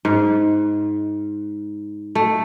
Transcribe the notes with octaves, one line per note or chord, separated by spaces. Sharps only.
G#2
A3